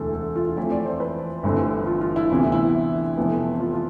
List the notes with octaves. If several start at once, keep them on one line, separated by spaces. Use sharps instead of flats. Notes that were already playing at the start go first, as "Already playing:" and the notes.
Already playing: E1 D2 C3 E3 A4
A4
F4
F2 E3 A3 C4 E4
D5
C5
B4
G1 G2 E3 A3 C4
F4
F4
E4
D2 C3 E3 B3 E4
E4
F1 F2 E3 B3
F4
F4